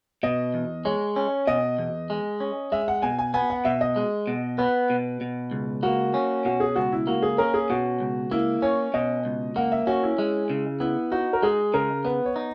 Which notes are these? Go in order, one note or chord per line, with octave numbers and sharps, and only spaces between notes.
B2 D#5
E2
G#3 C#5
C#4
B2 D#5
E2
G#3
C#4
G#3 E5
F#5
B2 G#5
G#5
B3 G#5
F#5
B2 E5
D#5
G#3
B2
B3 B4
B2
B2
C#2
A#3 F#4
C#4
B2 F#4
G#4
C#2 F#4
E4
A#3 F#4
G#4
C#4 A#4
G#4
B2 F#4
C#2
A#3 E4
C#4 C#5
B2 D#5
C#2
A#3 F#5
E5
C#4 F#4
E4
G#3
C#3
B3 E4
D#4 F#4
A#4
G#3 G#4
C#3 A#4
B3 B4
C#5
D#4